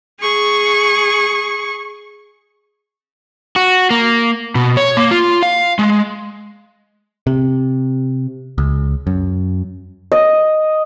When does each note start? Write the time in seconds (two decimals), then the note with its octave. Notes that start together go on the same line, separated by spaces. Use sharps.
0.20 G#4 C#6
3.56 F#4
3.90 A#3
4.55 B2
4.77 C#5
4.97 A#3
5.11 F4
5.43 F5
5.79 G#3
7.27 C3
8.58 C#2
9.07 F#2
10.12 D#5